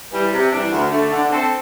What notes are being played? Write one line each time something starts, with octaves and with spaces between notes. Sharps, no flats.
E3 G3
C3
E3 G3 D4
D2
D3 A3
D3
C4 A4